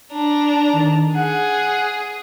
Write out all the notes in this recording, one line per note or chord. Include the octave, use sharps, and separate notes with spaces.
D4 A#5
D#3
G#4 F#5